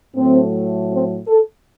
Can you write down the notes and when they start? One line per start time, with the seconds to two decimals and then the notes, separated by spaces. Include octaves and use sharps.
0.15 A2 F#3 A3 C4
0.90 C4
1.27 A4